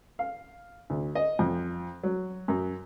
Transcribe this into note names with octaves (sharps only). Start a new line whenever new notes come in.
F5
D2
D#5
F2
F#3
F#2